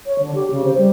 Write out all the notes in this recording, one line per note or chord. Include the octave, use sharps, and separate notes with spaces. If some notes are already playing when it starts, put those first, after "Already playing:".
C#5
D3
G4
C#3
C5
G3